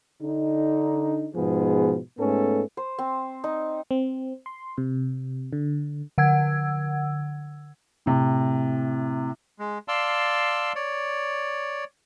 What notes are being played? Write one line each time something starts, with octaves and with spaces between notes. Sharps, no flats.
D3 D4 D#4
G#2 B2 F3 B3 G#4
G#2 A3 B3 C#4 A4
C5
C4
D#4
C4
C6
C3
D3
D3 F#5 E6 G#6
A2 C3
G#3
D5 F5 A5 C6 E6
C#5 D5